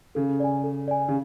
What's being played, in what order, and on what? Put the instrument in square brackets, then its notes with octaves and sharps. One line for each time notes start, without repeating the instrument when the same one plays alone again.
[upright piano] C#3 [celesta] A4
[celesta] D5 G#5
A4
D5 G#5
[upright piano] C#3